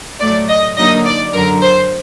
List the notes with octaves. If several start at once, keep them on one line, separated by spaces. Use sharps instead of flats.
A2 F#3 A3 D5
D#5
D3 F#3 A#3 D#4 D#5
D5
F#2 D3 F#3 A#4
C5